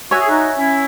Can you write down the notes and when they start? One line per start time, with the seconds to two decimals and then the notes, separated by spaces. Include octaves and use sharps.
0.11 F#4 C#5 E5 G#5
0.20 G#4
0.28 D#4 F#4
0.57 C#4 E4